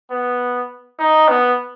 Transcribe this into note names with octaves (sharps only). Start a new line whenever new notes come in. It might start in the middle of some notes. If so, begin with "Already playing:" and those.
B3
D#4
B3